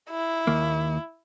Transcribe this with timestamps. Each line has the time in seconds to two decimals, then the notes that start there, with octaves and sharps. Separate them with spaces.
0.10 E4
0.47 D#2 A#3